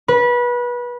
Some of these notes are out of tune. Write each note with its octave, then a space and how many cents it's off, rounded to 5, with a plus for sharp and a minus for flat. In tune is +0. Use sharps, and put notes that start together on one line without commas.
B4 -25